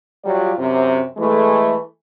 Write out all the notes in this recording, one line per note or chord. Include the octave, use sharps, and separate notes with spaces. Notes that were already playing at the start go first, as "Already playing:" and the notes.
F#3 G3 F4 G4 D5
F#2 C3
E3 G#3 A3